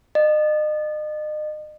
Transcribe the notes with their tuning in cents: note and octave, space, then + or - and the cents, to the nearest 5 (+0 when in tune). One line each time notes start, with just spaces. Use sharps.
D#5 -35